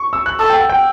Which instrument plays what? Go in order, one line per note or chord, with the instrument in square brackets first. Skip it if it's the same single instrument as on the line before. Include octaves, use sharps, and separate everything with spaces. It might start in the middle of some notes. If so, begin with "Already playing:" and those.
Already playing: [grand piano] C#6
E6
F#6
[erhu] A4 [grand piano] E6
[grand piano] G5
F#5
G5